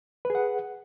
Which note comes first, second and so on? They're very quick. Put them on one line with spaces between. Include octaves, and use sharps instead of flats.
B4 G#4 F#5